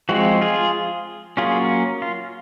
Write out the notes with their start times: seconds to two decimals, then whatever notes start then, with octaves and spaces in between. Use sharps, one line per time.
0.09 F3 G#3 C4 F#4
0.41 F4 G#4
1.37 F#3 A#3 C#4 F4 G#4
2.02 F4